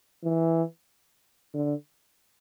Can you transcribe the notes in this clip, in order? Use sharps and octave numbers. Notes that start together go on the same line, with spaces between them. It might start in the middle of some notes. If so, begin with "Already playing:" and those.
E3
D3